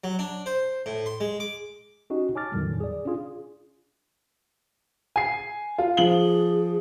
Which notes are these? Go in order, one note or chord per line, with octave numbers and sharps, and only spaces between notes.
F#3
D4
C5
A2
C6
G#3
D6
C#4 D#4 F#4 G4 D#5
C#5 G#5 A5 D6 F6 A6
E2 A2 D3 D#3 F#3 G3
G#4 D5
C#4 D4 F4 G#4
G#5 C7
F4
F3 G#4 F#7 G7